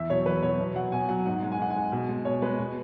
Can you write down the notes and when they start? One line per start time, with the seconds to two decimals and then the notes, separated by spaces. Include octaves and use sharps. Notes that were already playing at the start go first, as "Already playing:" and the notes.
Already playing: E2 E5
0.09 B2 F#3 C#5
0.26 E2 B4
0.42 B2 F#3 C#5
0.60 B2
0.76 F#3 F#5
0.92 B2 G#5
1.09 F#3 F#5
1.26 G#2 F#5
1.43 G#3
1.52 G#5
1.59 G#2 F#5
1.70 G#3 G#5
1.92 B2
2.09 G#3
2.25 B2 C#5
2.42 G#3 B4
2.59 B2